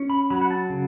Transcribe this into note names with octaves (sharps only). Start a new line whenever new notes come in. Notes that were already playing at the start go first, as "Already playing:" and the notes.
Already playing: C#4
B5
F#3 B5
F#5
A5
C#3